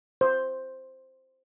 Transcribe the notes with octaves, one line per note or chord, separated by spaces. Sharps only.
C5